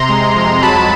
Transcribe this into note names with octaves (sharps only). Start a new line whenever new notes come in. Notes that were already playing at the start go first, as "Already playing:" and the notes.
Already playing: C3 A#5 C6
G#3
F2
F#3 A5 B5